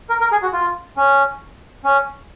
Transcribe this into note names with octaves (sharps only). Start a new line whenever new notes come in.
A#4
A#4
G#4
F#4
F4
C#4
C#4